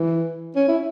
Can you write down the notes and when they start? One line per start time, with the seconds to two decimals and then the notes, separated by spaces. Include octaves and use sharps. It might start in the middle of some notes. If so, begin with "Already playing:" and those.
Already playing: E3
0.56 C#4
0.68 E4